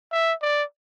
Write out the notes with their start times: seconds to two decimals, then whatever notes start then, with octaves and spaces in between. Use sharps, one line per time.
0.12 E5
0.42 D5